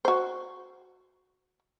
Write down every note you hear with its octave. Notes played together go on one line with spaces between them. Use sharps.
F#4 C5